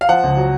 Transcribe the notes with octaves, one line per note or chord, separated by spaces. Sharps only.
F5
F3 F#5
C#2
F#3